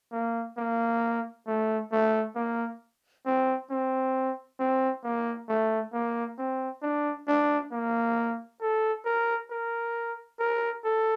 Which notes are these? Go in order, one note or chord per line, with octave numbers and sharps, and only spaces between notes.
A#3
A#3
A3
A3
A#3
C4
C4
C4
A#3
A3
A#3
C4
D4
D4
A#3
A4
A#4
A#4
A#4
A4